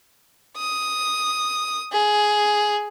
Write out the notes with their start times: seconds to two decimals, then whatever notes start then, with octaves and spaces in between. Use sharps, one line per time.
0.57 D#6
1.92 G#4